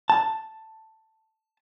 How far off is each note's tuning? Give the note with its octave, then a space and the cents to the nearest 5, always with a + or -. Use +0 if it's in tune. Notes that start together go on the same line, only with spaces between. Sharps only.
A5 +5